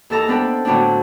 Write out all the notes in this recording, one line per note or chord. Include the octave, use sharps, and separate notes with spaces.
D#2 E3 A4 A5 A#5
B3 C4 D4 A4 B4
A2 D3 F#3 B3 C4 D4